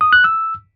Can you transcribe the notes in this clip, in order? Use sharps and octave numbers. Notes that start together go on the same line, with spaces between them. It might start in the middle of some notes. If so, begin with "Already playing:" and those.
D#6
F#6
E6